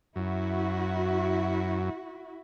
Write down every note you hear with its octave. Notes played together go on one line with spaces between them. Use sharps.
F#2 E4 F#4